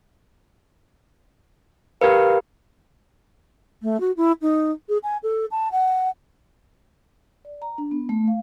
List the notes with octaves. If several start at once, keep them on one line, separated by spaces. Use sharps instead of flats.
G4 A#4 B4 F5
A3
F#4
E4
D#4
G#4
G#5
A4
A5
F#5
D5
A#5
D4
B3
A3
F5